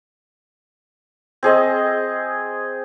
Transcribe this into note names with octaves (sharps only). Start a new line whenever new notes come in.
C4 G#4 D#5